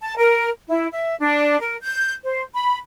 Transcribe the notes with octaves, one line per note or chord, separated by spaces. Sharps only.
A5
A#4
E4
E5
D4
A#4
G6
C5
B5